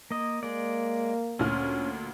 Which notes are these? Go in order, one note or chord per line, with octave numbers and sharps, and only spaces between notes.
A#3 D#5
G#3 A#3 D5
D2 A#2 C#4 F6